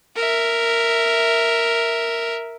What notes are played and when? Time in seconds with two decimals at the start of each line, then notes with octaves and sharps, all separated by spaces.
0.16 A#4 E5